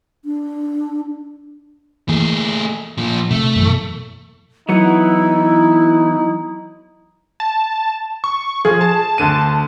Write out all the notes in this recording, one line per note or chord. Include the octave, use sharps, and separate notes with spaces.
D4
E3 A3 A#3 G#4
A#2 F3
C3 A3
F#2 B2 E3
E3 F#3 B3 D#4 E4 F#5
A5
C#6
F3 G#4
A5
D2 D3 D#7